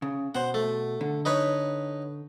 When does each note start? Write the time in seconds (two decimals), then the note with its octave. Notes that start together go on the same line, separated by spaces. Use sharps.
0.02 C#3
0.35 B2 C5 F#5
0.54 A3
1.01 D3
1.25 D#4 B4 C#5